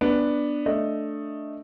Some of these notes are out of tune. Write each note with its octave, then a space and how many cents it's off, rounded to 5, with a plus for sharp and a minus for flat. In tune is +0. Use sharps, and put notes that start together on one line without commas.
B3 +0 D4 +5
A3 +0 D4 +0 D#5 +0